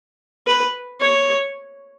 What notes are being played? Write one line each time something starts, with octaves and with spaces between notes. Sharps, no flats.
B4
C#5